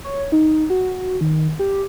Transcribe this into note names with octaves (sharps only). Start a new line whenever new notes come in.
C#5
D#4
F#4
D#3
G4